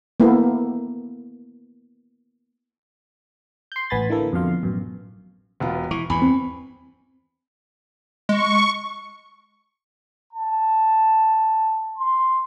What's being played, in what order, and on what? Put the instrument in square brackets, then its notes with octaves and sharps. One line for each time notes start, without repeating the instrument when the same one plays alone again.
[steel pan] A#3 B3 E4 A4
[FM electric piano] C6 G6
A1 B3 G#5 B5 A6
D3 E3 A#3 A4
F2 B2 D3 F5 C6
A1 F#2 B2
[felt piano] E1 B3 F4
[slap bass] E3 [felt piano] C#6
[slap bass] E2 G2 [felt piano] G#5 B5
[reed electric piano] C4
[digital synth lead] G#3 [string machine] C#6
[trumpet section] A5
C6